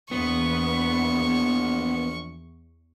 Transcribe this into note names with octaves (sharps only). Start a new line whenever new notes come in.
A#1 E2 B3 C#6